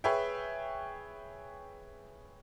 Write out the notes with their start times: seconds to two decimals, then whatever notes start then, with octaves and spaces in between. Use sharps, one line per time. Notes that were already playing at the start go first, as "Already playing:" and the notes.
0.04 G#4 B4 C#5 E5 G5